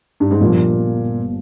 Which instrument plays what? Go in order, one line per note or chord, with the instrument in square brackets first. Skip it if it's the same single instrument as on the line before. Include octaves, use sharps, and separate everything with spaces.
[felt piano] G2
G#2
[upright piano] G1 G2 F3 A#3 [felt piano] A#2